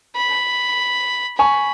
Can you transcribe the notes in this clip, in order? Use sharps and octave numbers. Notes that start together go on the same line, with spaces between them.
B5
G#5 B5 C#6